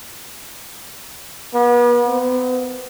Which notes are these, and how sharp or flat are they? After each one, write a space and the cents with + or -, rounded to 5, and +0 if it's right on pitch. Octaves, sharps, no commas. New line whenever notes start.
B3 -40
B3 +40